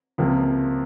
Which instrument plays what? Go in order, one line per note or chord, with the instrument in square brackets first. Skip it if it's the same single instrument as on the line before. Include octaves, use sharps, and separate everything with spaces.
[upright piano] C#2 C3 F3 A#3